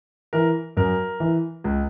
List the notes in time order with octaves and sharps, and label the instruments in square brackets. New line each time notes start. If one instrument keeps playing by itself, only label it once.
[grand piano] E3 A#4
F#2 A#4
E3
C#2